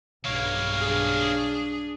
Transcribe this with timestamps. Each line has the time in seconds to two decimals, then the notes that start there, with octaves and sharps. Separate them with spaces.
0.25 B1 G2 C#3 A#3 C#5 F5
0.78 D4 G#4